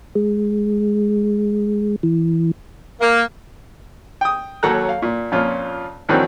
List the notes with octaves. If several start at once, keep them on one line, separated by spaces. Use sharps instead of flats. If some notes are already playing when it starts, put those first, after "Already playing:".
G#3
E3
A#3
G5 D#6
D#2 F#3 A4 C#5 A#5 F#6
F5
A#2
F2 A#2 C#4 F4
D2 D#3 E3 F#3 C4